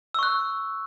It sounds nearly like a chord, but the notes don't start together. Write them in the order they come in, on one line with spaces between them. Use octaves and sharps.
E6 C#6 F#6